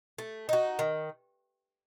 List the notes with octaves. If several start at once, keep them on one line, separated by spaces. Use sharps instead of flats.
A3
D#4 F#4
D#3